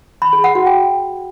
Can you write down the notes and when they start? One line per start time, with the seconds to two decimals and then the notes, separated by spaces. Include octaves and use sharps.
0.22 B5
0.33 G#4
0.44 F#5
0.55 F#4
0.66 G5